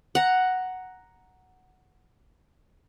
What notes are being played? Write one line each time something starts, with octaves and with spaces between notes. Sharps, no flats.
F#5 A#5